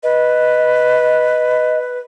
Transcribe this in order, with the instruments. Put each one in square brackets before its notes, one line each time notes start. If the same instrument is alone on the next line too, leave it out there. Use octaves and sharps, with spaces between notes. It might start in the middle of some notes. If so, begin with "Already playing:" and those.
[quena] B4 [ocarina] D#5